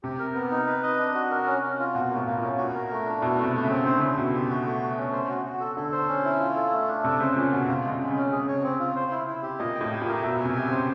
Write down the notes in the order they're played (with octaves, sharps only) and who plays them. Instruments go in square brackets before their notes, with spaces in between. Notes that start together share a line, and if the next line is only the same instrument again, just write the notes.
[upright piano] C3 [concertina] G4
[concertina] A#4
B3
D#4
B4
D#5
D4
F#4
A#4
C#4
C#4
F4
[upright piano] B2 [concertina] F#4
[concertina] A#3
[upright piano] A2
[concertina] A#3
[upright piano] A#2
[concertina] C#4
[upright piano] A#2 [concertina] F#4
[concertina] A#4
A3
D4
[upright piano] B2 [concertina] E4
[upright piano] C3 [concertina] A3
[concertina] A3
[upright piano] C#3
[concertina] C4
[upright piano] D3 [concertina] C5
[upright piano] C#3 [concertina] E4
[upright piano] B2 [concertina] E4
[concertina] G4
F#4
A3
A3
C#4
C5
F#4
F#4
A4
[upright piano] D3 [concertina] A4
[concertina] C5
C#4
E4
F4
A4
A3
D4
[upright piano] C3 [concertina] A4
[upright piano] C#3 [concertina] C5
[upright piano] A#2 [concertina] C#4
[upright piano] B2 [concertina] F#4
[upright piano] C3 [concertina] F4
[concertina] G#3
[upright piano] C#3
[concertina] G#3
[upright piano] C#3
[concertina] C#4
[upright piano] C#3 [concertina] G#4
[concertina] C#5
C4
F4
C5
E4
E4
G4
[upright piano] A#2 [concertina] D#5
[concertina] G5
[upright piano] A2
[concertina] G4
[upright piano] A#2
[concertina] A#4
[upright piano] B2 [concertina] E5
[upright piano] C3 [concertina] G#5
[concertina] G4
[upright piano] C#3 [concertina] C5